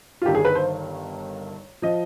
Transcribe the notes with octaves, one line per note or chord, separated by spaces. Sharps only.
F4
G1 G2 D#3 G4
G#4
B4
C5
F3 D#5